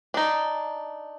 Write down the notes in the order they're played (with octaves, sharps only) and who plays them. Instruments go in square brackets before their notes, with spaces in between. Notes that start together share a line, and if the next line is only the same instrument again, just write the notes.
[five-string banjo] D4 D#4